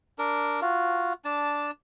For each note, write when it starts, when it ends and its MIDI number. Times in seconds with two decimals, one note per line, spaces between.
0.19 0.60 62
0.19 0.60 70
0.62 1.13 65
0.62 1.13 66
1.25 1.71 62
1.25 1.71 81